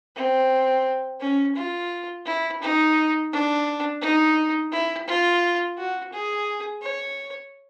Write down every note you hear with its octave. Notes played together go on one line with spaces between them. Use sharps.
C4
C#4
F4
E4
D#4
D4
D#4
E4
F4
F#4
G#4
C#5